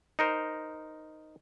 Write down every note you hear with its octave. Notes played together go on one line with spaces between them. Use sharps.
D#4 A#4 C5